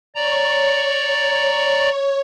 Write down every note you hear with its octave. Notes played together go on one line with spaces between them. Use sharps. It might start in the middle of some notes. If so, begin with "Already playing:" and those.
C#5 D5 A#5